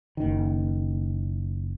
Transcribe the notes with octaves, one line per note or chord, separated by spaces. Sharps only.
F#1 D#3